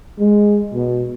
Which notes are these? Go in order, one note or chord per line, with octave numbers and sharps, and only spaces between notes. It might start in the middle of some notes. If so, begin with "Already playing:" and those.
G#3
B2